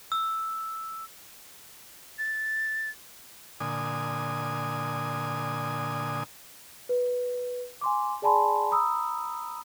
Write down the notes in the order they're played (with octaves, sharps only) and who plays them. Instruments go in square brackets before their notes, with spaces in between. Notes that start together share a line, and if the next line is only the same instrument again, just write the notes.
[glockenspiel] E6
[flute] A6
[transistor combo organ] A#2 D3 G#5 D#6
[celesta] B4
G#5 C6 D6
G#4 D5 G#5 A5 B5 C6
A#5 B5 D#6 E6